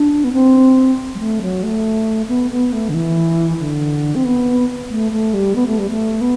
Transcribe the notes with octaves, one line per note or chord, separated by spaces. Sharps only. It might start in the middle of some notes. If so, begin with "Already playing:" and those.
Already playing: D4
B3
C4
G3
A3
F#3
A3
B3
B3
A3
D3
E3
D3
C4
B3
A3
A3
G3
B3
A3
G3
A3
B3